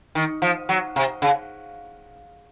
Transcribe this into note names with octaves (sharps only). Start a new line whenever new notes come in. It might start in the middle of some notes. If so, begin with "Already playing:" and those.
D#3
F3
F#3
C3
C#3